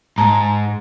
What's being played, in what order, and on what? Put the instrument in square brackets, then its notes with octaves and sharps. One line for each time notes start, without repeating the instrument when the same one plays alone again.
[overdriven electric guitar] G#2 [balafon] A5 A#5